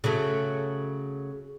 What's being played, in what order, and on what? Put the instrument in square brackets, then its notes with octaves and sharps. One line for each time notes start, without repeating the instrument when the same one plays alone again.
[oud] C#3 F#3 A3